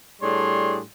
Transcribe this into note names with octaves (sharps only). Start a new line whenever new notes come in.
A2 G3 D4 G#4 C#5 C6